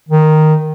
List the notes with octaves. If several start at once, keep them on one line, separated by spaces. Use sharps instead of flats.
D#3